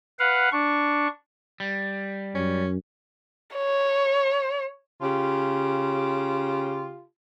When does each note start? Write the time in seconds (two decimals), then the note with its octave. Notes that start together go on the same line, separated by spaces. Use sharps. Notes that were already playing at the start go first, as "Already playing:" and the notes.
0.19 B4 F5 F#5
0.52 D4 C#6
1.60 G3
2.35 F#2 C#4
3.56 C#5
5.01 C#3 F4 G4